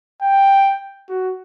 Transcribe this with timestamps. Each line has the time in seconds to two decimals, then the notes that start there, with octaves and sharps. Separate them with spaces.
0.21 G5
1.09 F#4